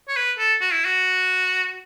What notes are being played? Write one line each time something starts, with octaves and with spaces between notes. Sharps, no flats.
C#5
B4
A4
F#4
E4
F#4